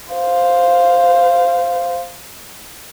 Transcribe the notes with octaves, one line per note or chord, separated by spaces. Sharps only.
C5 F5